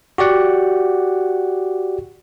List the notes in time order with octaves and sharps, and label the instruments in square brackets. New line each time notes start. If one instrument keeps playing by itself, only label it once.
[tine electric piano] F#4 G4 D5 F#5